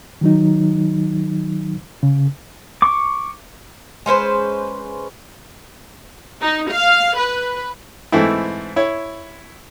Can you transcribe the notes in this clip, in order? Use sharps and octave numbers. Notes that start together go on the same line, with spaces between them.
D#3 F#3 D#4
C#3
C#6 D6
G#3 C#4 B4 C5
D#4
F5
B4
G#2 E3 A3 C4 E4
E4 C#5